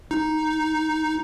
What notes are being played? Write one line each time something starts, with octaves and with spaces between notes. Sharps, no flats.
D#4